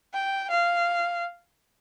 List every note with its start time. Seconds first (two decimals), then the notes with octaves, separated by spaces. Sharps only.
0.14 G5
0.50 F5